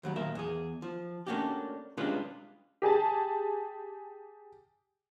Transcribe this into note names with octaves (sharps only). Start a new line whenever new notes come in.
D#2 F#3 G3
D#2 A#2 A#4 E5 F5
E2 G#4
F3
A3 A#3 C#4 D4 F#4 G4
G3 G#3 C#4 D4 F4 B4
G4 G#4 G#5 A5